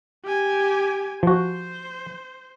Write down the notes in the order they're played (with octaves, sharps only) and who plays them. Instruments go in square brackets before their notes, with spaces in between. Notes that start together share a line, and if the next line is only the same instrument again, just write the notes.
[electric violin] G4 G#5
[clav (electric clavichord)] F3 F#4 [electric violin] C5